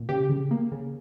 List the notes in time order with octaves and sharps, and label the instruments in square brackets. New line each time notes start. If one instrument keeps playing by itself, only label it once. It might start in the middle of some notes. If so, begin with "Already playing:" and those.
Already playing: [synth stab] A#2
C#3 G4
C#3
A#3
C#3